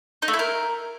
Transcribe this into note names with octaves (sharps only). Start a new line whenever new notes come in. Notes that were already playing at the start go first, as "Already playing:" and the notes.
D#4
A3
E4
A#4